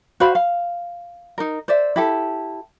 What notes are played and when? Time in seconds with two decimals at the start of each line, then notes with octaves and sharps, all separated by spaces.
0.20 F#4 C5 F5 B5
0.35 F5
1.38 D#4 A#4
1.68 C5 D5 E5
1.96 E4 G4 A4